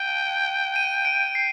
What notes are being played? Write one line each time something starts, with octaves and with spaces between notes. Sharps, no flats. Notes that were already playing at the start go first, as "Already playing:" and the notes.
Already playing: G5 D#7
D#7
D7
C7